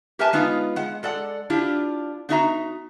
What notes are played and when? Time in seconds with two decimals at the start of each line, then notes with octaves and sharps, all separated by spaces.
0.19 G4 A#4 B4 E5 G#5 A5
0.33 G#3 B3 D#4 F4 F5
0.76 G#3 F#5
1.03 G#3 A4 D5 F#5
1.50 D4 E4 F4 G4
2.29 B3 D4 D#4 F#4 E5 A#5